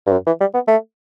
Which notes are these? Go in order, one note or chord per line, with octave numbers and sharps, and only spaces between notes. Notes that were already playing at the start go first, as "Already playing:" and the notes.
G2
F#2
E3
G3
B3
A3